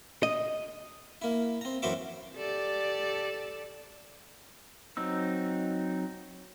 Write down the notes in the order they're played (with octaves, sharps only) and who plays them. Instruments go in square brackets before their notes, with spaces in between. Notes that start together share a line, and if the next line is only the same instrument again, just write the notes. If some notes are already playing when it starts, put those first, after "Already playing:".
[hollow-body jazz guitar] D#5
[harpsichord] A#3 E4
C4 A#5
F#2 E3 F#4 C5 E5 D6
[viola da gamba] G4 A4 D5
[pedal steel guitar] F#3 C4 D#4 E6